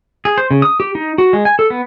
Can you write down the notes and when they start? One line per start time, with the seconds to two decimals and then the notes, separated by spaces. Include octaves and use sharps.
0.25 G#4
0.38 C5
0.51 C#3
0.62 D#6
0.80 G4
0.95 D#4
1.18 F#4
1.33 G#3
1.45 G#5
1.59 A4
1.70 B3